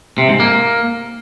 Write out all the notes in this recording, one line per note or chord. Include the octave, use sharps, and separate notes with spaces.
C3
G#2
A#3